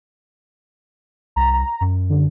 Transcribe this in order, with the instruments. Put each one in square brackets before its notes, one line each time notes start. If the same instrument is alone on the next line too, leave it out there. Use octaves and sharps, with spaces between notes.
[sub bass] C2 [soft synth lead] A#5
[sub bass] F#2
[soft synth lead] D3